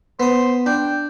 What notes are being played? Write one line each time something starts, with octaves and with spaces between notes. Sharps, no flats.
B3 C5 D#6
D4 G5